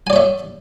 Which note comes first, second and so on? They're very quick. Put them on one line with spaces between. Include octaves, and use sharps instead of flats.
G#5 D5 C#5 E5